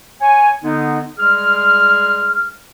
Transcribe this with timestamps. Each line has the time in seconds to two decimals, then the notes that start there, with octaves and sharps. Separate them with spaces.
0.22 C#5 G#5
0.63 D3 B3 D#4
1.18 G3 G#3 G#4 F6